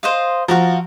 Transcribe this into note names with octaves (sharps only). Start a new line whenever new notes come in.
C5 D#5 F5
F3 F#4 F5 A#5